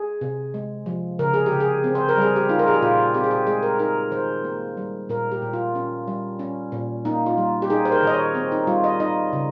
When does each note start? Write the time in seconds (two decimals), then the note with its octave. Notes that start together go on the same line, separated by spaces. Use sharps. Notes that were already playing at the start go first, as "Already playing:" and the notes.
Already playing: G#4
0.21 C3
0.54 G#3
0.86 F3
1.19 C#3 A#4
1.34 G#4
1.46 G4
1.52 C#3
1.60 G#4
1.84 C4
1.95 C5
2.09 A#4
2.17 G3 G#4
2.36 G4
2.49 D#4 F4
2.59 A#4
2.67 G#4
2.74 G4
2.82 A#2 F4
3.14 C4 G4
3.24 G#4
3.31 G4
3.47 G#3 G#4
3.63 A#4
3.79 D#4 A#4
4.12 D#3 C5
4.45 A#3
4.77 G3
5.09 A#2 A#4
5.32 G4
5.42 A#2
5.53 F4
5.75 C#4
6.08 G3
6.39 C#4
6.72 A#2
7.05 A#3 D#4
7.26 F4
7.38 G3
7.62 G4
7.70 D#4 G#4
7.85 C5
7.92 A#4
8.03 D#3 D#5
8.13 C#5
8.35 C4
8.52 D#4
8.67 G3 F4
8.84 D#5
9.00 D#4 D#5
9.33 C#3